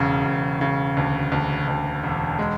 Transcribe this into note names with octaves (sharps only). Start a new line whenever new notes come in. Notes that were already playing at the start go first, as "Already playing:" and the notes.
Already playing: E1 C#3
E1
C#3
D2
D2
D2
E1
G#3